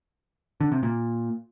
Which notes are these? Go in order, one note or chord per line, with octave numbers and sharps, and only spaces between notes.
D3
C3
A#2